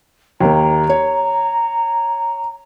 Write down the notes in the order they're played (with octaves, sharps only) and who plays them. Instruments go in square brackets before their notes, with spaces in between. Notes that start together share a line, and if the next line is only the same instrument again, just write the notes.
[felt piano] D#2 A#3 [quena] A#5
[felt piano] C#5